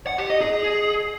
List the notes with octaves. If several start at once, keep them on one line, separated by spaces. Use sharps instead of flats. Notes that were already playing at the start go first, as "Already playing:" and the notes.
F#5
G4
D#5
G#4